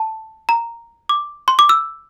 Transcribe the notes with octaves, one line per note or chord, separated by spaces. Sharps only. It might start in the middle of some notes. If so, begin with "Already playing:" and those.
Already playing: A5
A#5
D6
C6
D6
E6